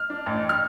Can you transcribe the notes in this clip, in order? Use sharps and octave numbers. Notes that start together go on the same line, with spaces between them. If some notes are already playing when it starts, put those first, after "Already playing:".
Already playing: F6
D4
A1
F6